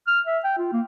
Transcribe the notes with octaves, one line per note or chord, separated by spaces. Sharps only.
F6
E5
G5
F4
A#3